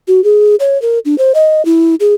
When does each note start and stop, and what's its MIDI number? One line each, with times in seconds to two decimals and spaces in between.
0.08 0.23 66
0.24 0.55 68
0.60 0.80 73
0.82 0.99 70
1.05 1.18 62
1.18 1.32 72
1.35 1.64 75
1.65 1.95 64
2.00 2.14 68